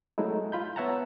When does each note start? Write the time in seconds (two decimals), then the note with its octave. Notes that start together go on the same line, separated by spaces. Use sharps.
0.18 F#3 G#3 A3 D#4 E4
0.52 F4 B5 G6
0.76 B3 C#5 E5 F#5 A5 A#5